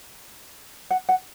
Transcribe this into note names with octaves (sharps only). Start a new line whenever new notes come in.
F#5
F#5